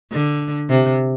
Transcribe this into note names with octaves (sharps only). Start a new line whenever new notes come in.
D3
C3